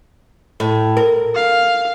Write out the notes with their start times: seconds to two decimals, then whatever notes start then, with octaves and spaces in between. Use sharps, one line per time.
0.60 A2
0.97 A#4
1.35 F5